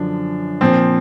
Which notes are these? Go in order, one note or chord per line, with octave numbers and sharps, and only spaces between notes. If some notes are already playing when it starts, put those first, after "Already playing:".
Already playing: F#2 D3 F3 D4
A#2 F3 C4